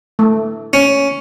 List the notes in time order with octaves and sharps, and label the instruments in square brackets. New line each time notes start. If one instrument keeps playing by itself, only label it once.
[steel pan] A3
[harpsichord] C#4